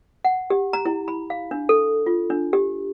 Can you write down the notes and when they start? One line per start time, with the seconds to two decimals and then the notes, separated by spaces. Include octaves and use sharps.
0.25 F#5
0.50 G4
0.73 A#5
0.85 E4
1.08 B5
1.30 F5
1.51 D4
1.69 A4
2.06 F4
2.30 D4
2.53 G4